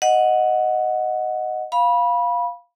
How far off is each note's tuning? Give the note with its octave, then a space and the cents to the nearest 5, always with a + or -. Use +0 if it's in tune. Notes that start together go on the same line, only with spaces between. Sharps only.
D#5 +0 F#5 -5
F5 +5 B5 -20